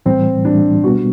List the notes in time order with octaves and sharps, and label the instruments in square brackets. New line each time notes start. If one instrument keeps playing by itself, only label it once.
[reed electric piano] A2 E3 G3 [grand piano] C4
[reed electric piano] A2 E3 G3 [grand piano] D4
[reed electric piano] B2 G3 B3 [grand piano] F#4